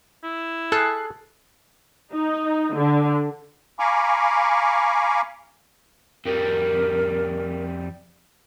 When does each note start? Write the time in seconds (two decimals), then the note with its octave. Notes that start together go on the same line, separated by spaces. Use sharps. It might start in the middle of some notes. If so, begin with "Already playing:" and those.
0.24 E4
0.72 G#4 A4 F6 F#6
2.14 D#4
2.76 D3
3.79 F5 G#5 A#5 B5 C#6 D6
6.26 F2 G3 A#4